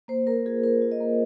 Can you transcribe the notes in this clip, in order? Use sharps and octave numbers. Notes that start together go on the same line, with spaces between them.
A#3 C5
A#3 A#4
F4 G#4
F4 A#4
F4
D#5
A#3